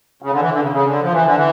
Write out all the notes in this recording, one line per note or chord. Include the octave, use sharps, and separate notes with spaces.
C#3
D3
E3
D3
C#3
C#3
D3
F3
E3
D3
E3